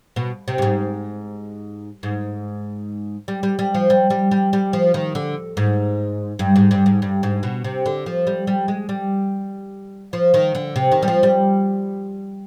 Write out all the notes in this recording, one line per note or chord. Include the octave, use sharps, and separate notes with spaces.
B2
C3
G2
G#2
G#2
G3
G3
G3
F3
G3
G3
G3
G3
F3
D#3
D3
G#2
G2
G#2
G2
G#2
G2
G#2
B2
C3
D3
F3
G3
G3
G#3
G3
F3
D#3
D3
C3
D#3
G3
F3
G3